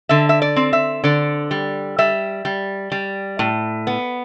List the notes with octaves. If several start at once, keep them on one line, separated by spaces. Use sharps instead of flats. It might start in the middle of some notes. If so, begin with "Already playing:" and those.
D3 E5
E5
D5
C4
E5
D3 D5
G3
G3 E5
G3
G3
A2
B3